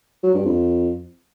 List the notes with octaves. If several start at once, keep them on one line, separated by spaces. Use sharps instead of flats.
F#3
G2
F2